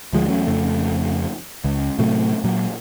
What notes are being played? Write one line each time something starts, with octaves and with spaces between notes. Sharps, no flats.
D2 F3 G#3
E2 F#3 A3 C#4
F2 C#3 A3
C#2
A2 C3 F#3 A3
A#2 F#3